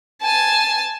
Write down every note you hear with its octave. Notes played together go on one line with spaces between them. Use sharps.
G#5 A5